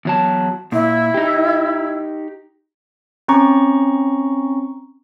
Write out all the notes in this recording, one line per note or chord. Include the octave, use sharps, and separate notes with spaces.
E2 F#3 A5
A#2 E4
D#4 G4
C4 C#4 A#5 C#6